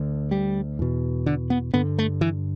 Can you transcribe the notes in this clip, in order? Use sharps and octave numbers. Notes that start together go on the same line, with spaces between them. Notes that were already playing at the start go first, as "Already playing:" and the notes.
Already playing: D2 D3
G3
E2 B2
D3
B3
G2 D3 B3
A3
E3